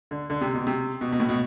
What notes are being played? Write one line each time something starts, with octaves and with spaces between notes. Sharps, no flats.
D3
D3
C3
B2
C3
B2
B2
A2
B2